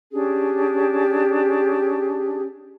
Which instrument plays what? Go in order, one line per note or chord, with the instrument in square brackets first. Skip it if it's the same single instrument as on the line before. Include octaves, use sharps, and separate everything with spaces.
[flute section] C#4 D4 G4 G#4